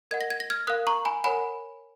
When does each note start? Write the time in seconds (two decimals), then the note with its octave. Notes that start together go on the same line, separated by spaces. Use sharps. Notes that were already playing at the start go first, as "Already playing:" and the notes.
0.11 A#4 D#5 F#5 G#6
0.21 A#6
0.30 G#6
0.40 A#6
0.50 F6 G#6
0.67 A#4 F5 D#6 F#6
0.87 A#5 C#6
1.05 G#5 B5
1.24 A#4 C#5 F#5 G#5 B5